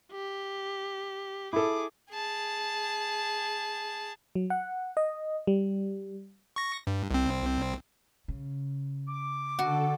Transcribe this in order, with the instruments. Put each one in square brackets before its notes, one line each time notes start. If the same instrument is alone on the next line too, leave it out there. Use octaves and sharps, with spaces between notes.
[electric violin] G4
[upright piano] E4 A4 [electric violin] G#4 D6
[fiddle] G#4 A5
[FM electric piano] F#3
F#5
D#5
G3
[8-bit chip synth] C#6 A#6
G2
C2 C4
[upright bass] C#3
[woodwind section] D6
[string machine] D3 A4 [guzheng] F#4